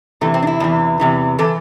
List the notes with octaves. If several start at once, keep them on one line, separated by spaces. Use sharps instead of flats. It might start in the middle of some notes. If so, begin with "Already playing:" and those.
E2 C3 E3 A3
C4
D4
E4
E2 C3 E3
E2 C3 E3
C3 E3 A4